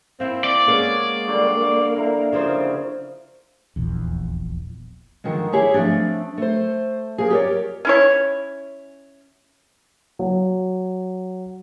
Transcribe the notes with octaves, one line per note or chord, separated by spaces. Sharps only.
A#3 C4 E4
D5
G#3 A#3 B3 C#4
D3 G3 F#4
D3 E4 A#4
C#3 F3 C4
D#1 A#1 E2
D3 D#3 F3 G#3
E4 G4 G#4 C#5 E5
F3 A3 C4 D4
A3 C5
A#3 G#4
G4 A#4 B4 C#5 D5
C#4 E4 C#5
F#3